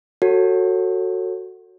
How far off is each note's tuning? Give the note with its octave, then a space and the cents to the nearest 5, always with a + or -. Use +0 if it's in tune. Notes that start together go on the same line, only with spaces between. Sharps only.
F#4 +0 A4 +25 C#5 -20